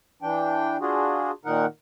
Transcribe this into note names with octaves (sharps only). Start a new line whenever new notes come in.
E3 D4 G5
D4 F4 F#4 G#4
A#2 D#3 D#4 A#4 F#5